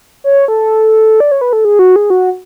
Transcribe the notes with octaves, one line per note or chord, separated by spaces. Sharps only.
C#5
A4
D5
C#5
B4
A4
G#4
F#4
G#4
F#4